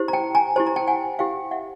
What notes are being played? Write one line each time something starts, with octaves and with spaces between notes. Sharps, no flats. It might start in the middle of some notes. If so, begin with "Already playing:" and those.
Already playing: E4 G4 C5
A#5
G5 A5
G#5 A#5
E4 G4 C5 A5
A#5
G5 A5
F#5 G#5
E4 G4 C5 F5 G5
E5 F#5